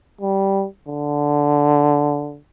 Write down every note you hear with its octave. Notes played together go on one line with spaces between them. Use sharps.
G3
D3